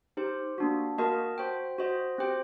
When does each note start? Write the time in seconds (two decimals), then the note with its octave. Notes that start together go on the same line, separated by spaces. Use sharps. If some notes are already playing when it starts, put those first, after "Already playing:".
0.17 D#4 G4 C5
0.58 A#3 D4 F#4
0.98 A#3 F#4 A#4 D#5 A5
1.38 F#4 C5 G5
1.78 F#4 C5 D#5
2.18 C4 G4 C5 G5